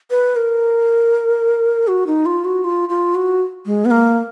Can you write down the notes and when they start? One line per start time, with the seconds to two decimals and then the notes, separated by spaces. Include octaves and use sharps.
0.11 B4
0.36 A#4
1.88 F#4
2.07 D#4
2.26 F4
2.45 F#4
2.64 F4
2.89 F4
3.15 F#4
3.66 G#3
3.85 B3
3.91 A#3